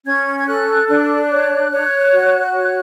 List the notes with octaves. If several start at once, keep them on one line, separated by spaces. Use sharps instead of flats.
C#4 G#6
G#6
A4 F#6
D4 F#6
C#5
C#5
F#4
C#5